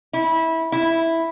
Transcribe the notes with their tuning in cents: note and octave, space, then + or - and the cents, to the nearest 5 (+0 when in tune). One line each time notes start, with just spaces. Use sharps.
E4 -20
E4 -5